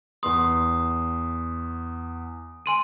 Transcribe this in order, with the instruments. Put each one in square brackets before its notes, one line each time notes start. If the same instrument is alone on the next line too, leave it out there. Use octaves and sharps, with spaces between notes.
[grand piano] E2 B3 C6 [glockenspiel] D#6
[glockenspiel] G#5 C6 D#7